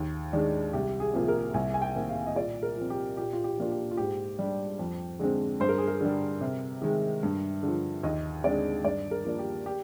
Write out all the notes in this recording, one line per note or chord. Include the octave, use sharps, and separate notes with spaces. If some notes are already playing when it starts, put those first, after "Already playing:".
Already playing: D#2
D#3 G#3 D4
C2 G4
G#4
C3 F3 A#3
A#4
C2 G#5
G#5
G5
C3 D#3 A#3
F5
D#5
A#2 D5
A#4
F3 C4
G4
A#2 G4
F4
G4
F3 A#3 D4 F4
G4
F4
G#2 G4
G3 D4
F2
D3 G#3 C4
G2 C5
A#4
G#4
A#4
D3 G3
C3
D#3 G#3
G2
D3
F3
D#2 D#5
D3 G#3 C4 D5
G2 D5
A#4
F3 A#3 D4
G4
G4